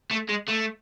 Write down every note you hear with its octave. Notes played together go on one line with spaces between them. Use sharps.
A3
G#3
A3